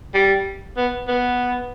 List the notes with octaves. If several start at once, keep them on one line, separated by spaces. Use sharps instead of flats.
G3
B3
B3